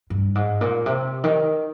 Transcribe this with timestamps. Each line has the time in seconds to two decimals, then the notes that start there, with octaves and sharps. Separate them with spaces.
0.10 G2
0.35 G#2
0.61 A#2
0.86 C3
1.24 D#3